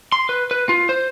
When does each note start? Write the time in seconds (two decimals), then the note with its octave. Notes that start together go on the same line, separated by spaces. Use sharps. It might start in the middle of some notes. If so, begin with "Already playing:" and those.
0.12 C6
0.29 B4
0.51 B4
0.69 F4
0.89 C5